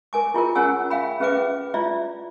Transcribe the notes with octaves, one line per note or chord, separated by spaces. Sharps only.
A#4 G#5 D6
E4 F4 G#4 A#4
C#4 G#4 C#5 F#5 G#5 E6
E5 F5 G5 B5
C#4 G#4 B4 E5 G5 D6
E4 F4 D5 E5